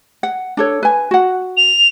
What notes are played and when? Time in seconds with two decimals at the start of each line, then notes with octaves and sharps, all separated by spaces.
0.23 F#5
0.57 D4 A4 C#5
0.83 B4 G#5
1.11 F#4 F#5
1.57 F7